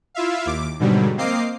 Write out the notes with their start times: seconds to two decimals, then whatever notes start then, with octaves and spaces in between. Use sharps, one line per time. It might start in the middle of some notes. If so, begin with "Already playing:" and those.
0.15 E4 F4 E5 F5
0.46 D#2 D6
0.80 G#2 B2 D3 F#3 G3
1.17 A#3 C4 D#5 F5 D6 C7